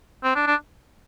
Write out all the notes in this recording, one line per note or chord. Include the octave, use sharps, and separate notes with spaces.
C4
D4
D4